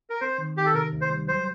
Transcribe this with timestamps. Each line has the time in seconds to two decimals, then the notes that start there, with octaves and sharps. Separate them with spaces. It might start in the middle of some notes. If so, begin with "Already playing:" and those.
0.10 A#4
0.21 C4 C5
0.38 D#3
0.57 D#3 G4
0.66 A4
0.74 C3 A#4
0.93 D2
1.01 C5
1.10 G3
1.28 F#3 C5